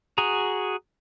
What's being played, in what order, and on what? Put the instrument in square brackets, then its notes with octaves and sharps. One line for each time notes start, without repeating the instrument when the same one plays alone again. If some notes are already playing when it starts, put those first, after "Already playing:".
[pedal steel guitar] F#4 G#4 A#5